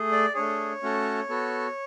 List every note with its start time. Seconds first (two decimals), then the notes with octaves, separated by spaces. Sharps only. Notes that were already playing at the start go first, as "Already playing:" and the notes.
Already playing: A3 G#4
0.12 D5
0.34 A3 D4 G#4 C#5
0.83 A3 C#4 F#4 A4
1.29 B3 F#4 A4